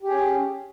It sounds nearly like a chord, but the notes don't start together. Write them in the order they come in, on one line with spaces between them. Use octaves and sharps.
G4 G#4 C#4